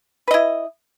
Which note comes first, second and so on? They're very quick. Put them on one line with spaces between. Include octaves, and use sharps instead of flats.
B4 D#5 E4